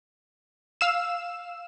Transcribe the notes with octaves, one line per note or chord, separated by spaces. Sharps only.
F5 E6 E7